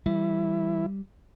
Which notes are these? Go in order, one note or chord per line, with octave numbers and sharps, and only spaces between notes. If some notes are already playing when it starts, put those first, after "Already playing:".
E3 G3 E4